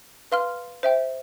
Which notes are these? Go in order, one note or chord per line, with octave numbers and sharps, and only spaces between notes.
B4 F5 C6 F6
C5 E5 G5